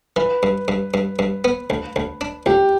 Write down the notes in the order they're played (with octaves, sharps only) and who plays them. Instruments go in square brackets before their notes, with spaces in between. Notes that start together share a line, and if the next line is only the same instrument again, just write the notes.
[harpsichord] E3 [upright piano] B4
[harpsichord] G2
G2
G2
G2
B3
D2
D2
D4
[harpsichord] D2 [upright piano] G4